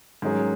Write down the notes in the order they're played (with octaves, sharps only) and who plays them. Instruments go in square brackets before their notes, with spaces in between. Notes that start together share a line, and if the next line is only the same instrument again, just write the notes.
[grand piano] G#2 [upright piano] D#3 F#3 C#4 G#4